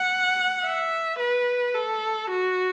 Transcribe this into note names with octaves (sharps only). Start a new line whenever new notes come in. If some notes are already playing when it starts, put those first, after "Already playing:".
Already playing: F#5
E5
B4
A4
F#4